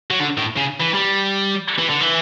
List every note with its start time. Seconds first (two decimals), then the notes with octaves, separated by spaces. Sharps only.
0.11 F#3
0.20 D3
0.38 A2
0.57 C#3
0.80 E3
0.94 G3
1.79 E3
1.89 D3
2.01 E3